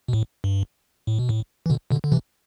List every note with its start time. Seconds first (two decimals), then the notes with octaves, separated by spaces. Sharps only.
0.08 B2
0.13 A2
0.44 G2
1.07 A2
1.19 B2
1.29 A2
1.66 E3
1.70 B2 D3
1.91 B2 D3
2.04 D3
2.12 C3 E3